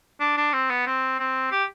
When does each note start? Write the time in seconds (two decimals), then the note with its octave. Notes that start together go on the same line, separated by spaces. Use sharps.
0.20 D4
0.37 D4
0.53 C4
0.70 B3
0.86 C4
1.19 C4
1.51 G4